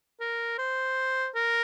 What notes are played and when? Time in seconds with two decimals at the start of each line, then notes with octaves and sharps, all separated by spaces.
0.20 A#4
0.59 C5
1.35 A#4